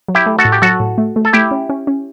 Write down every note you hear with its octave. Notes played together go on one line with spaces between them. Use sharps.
F#3
E4 G4
A3
F#4 A4
A2
G4
F#3 F#4 A4
A2
A3
A3
A4
A3 E4 G4
C#4
C#4
C#4